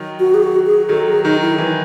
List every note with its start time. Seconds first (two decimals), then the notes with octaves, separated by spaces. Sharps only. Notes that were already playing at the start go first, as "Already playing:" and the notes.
Already playing: D#3 F#3
0.20 F#4
0.34 G#4
0.43 F#4
0.66 G#4
0.89 D#3 F#3 A4
1.07 G#4
1.24 D#3 F#3 D#4
1.42 E4
1.58 E3